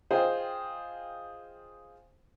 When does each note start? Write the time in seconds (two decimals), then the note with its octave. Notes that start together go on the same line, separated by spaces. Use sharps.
0.11 F4 G#4 C5 D#5 G5